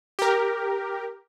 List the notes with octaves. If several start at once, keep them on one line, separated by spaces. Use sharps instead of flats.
G4 A#4